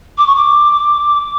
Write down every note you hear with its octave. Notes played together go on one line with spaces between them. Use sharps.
D6
C#6
D6